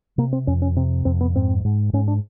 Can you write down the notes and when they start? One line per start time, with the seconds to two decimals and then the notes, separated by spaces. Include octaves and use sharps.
0.18 C3 A#3
0.33 C4
0.47 F2 C#4
0.62 C#4
0.76 C3 C4
1.05 F2 C4
1.21 B3
1.35 G#2 C4
1.65 G#2
1.93 G#2 C#4
2.08 D4